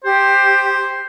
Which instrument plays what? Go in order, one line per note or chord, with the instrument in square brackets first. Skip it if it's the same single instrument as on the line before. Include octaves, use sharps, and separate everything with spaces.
[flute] G4 [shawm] C5